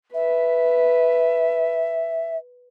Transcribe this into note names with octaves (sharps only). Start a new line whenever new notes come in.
B4 E5